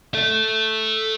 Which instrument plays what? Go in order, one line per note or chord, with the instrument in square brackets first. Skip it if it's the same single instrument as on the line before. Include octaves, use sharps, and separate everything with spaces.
[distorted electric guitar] A4 E5